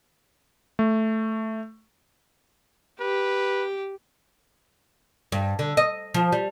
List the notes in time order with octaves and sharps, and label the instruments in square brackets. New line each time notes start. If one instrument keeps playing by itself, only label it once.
[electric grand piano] A3
[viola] G4 [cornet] B4
[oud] G2
D3
D#5
F3
G3